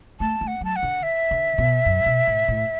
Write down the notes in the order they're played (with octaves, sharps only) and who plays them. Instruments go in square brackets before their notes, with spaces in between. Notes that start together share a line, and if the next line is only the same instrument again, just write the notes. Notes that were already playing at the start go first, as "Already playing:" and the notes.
[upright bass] A3 [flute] A5
[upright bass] A3
[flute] F#5
[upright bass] F#3 [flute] A5
[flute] F#5
[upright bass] D3
[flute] E5
[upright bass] D3
B2
F#2
B2
A2
A2